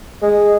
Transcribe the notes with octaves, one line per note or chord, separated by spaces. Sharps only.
G#3